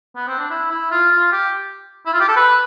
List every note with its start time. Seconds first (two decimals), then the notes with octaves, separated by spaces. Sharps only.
0.16 B3
0.28 C4
0.39 D4
0.50 E4
0.71 E4
0.91 F4
1.12 F4
1.32 G4
2.06 E4
2.13 F4
2.20 G4
2.28 A4
2.36 B4